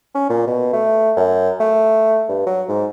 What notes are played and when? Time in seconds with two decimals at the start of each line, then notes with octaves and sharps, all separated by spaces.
0.15 C#4
0.29 A#2
0.47 B2
0.73 A3
1.17 F#2
1.60 A3
2.29 G2
2.46 F#3
2.68 G#2